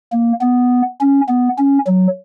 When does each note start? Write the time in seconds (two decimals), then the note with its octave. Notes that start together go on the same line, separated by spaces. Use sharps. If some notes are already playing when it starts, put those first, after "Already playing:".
0.12 A#3
0.41 B3
1.01 C#4
1.29 B3
1.58 C#4
1.87 F#3